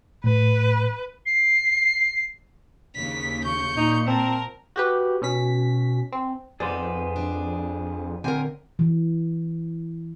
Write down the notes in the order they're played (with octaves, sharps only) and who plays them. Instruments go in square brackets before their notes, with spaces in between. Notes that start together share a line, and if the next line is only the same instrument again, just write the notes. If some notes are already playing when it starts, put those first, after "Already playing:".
[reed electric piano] A2 [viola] B4
[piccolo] C7
[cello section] D#2 C#3 [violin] B6
[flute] C#6 [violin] G6 C#7
[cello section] A#2 [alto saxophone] D#4
[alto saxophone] C4 [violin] A#4 [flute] A5
[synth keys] F#4 G4 B4
B2 C#4 B6
C4
[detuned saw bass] F2 [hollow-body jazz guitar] B3 D5 [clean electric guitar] G#4 C5 [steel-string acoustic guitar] B4
[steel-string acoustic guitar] D4
[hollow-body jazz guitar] D3 C4 [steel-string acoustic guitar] A#4 G#5
[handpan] E3